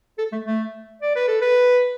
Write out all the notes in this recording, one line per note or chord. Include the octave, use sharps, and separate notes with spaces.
A4
A3
A3
D5
B4
A4
B4